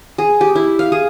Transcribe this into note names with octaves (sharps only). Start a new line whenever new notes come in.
G#4
G4
E4
F5
G#4